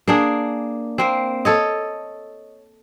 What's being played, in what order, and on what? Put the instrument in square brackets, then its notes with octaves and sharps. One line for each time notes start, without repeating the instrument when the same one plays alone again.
[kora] A#3 D4 G#4
A#3 C4
A4 C#5 D#5